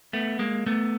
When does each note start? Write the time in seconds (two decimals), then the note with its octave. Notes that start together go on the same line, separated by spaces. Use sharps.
0.13 A3 B3
0.39 G#3 A#3
0.66 A3 B3